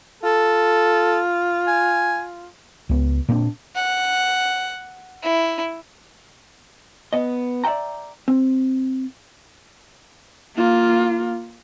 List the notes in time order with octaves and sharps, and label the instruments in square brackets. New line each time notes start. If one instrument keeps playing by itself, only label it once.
[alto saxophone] F4 [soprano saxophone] A4
[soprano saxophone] G#5
[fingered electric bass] C#2 B3
A#2 A#3 C4 D4
[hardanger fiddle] F#5
E4
[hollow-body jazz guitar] B3 D#5
D5 E5 F#5 G5 A#5
C4
[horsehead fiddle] A#3 F4